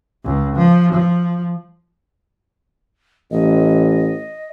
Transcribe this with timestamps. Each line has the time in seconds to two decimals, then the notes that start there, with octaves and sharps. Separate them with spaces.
0.25 C#2
0.56 F3
0.93 F3
3.31 A1 D#5